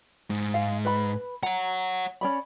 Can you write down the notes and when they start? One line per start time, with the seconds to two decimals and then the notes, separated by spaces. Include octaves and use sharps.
0.30 G#2
0.54 F5
0.85 B4 B5
1.43 C#5 F#5 A#5
2.21 C#4 D5 B5